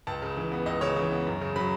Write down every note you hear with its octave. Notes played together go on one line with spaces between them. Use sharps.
C#2 A5
C#3
E3
B3
C#2 D#5
C#3 C#5
E3
B3
F#2
C#3
F#3 B5